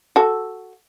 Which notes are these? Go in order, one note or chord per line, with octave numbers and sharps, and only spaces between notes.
F#4 A4